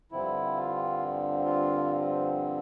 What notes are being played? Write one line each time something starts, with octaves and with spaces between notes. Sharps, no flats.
G2 D3 F3 C4 E4
F4
F4